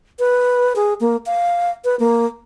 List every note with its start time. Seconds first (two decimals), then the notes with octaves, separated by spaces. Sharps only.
0.19 B4
0.76 G#4
1.01 A#3
1.26 F5
1.85 B4
2.00 A#3